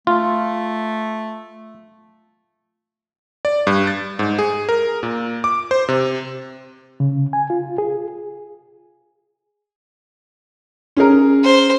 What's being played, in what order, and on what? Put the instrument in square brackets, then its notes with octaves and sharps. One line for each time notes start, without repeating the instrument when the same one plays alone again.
[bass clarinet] A3 [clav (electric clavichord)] F4
[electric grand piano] D5
G2
A6
G#2
G#4
A#4
A#2
D6
C5
C3
[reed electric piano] C#3
G#5
F4
G#4
[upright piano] C#4 G#4 A#4
[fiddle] C5